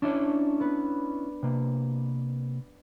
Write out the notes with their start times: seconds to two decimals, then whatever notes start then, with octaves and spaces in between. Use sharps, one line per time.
0.02 C#4 D4 E4 C#5
0.60 B3 B4
1.43 C3 A#3